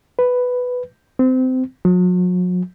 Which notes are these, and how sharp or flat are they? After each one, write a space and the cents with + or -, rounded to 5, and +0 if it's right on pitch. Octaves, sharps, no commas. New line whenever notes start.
B4 +5
C4 -25
F#3 -40